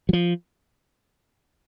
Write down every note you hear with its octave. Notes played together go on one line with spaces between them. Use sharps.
F#3
F3